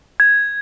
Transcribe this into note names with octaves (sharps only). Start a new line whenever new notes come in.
G#6